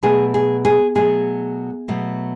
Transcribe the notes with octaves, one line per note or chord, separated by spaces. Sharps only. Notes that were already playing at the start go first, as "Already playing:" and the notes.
B2 F#3 A3 G#4
G#4
G#4
B2 F#3 A3 G#4
B2 F#3 A3